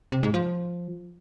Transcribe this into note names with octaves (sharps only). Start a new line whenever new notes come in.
C3
G#2
F3